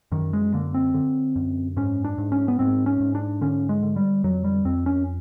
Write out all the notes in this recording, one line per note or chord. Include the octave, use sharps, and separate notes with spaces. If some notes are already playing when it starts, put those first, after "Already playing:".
F#2 D#3
G#3
D3 A#3
C4
D3
F#2
G#2 C#4
D4
G#2
C#4
B3
G#2 C4
C#4
G#2
D4
D3 C#4
G#3
D3
G3
F2 F#3
G3
F2 C4
C#4